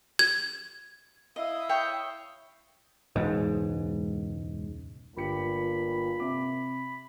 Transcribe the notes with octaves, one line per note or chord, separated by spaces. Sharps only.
G#6
E4 D#5 F5 D#6
C#5 E5 G5
E1 C#2 G#2
G1 A#2 G4 B5 C#7
C3 D6